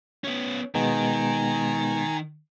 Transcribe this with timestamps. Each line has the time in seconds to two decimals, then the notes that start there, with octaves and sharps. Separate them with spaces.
0.24 B3 C#4
0.75 B2 D#3 G#3 B3 G#5 A#5